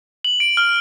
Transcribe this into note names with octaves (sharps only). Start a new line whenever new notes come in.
F#7
D7
F6